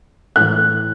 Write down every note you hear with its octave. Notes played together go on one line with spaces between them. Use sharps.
A2 E3 F#6